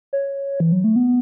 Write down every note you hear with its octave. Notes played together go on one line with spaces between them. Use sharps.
C#5
E3
F#3
A3
B3